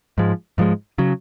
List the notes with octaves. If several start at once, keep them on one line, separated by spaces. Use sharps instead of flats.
G#2 F3 G#3
G#2 F3 G#3
C#3 F#3